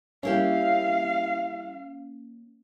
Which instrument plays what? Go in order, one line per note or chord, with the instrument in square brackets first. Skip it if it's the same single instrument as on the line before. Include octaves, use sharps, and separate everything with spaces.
[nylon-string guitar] G3 E4 G4 [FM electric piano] A#3 C#4 [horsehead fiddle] F5